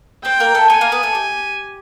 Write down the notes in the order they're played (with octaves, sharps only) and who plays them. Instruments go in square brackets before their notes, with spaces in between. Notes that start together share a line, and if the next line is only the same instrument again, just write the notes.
[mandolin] C4 C5 [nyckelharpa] G5
[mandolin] A#3 A#4
A3 A4
[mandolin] A3 A4 [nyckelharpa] G#5
[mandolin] A#3 A#4
B3 B4
A3 A4
G4